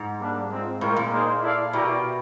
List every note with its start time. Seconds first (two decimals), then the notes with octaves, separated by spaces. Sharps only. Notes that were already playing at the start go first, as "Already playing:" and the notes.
Already playing: G#2
0.20 G3 A#3 D4
0.50 G#3 C4 F4
0.81 A2 G#3 C4 F4 A#4
0.96 A#2
1.12 A#3 D#4 G#4 C5
1.42 E4 A4 D5 F5
1.73 B2 E4 G4 A#4 D5